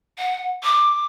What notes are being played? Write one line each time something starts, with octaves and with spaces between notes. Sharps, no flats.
F#5
D6